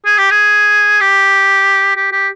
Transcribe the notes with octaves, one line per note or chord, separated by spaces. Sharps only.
G#4
G4
G#4
G4
G4
G4